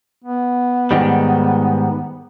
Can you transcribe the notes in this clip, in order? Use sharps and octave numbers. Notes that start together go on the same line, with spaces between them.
B3
G#2 D#3 G3